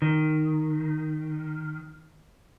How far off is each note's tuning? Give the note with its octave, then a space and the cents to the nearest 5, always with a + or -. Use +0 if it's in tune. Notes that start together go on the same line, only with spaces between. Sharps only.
D#3 -5